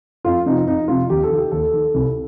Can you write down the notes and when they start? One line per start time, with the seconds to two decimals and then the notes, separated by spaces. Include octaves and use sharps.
0.24 F2 F4
0.46 C3 F3 D#4
0.67 F2 D#4
0.88 C3 F3 F4
1.10 D#2 G4
1.23 A4
1.31 D#3
1.38 G4
1.51 D#2 A4
1.73 D#3
1.94 C2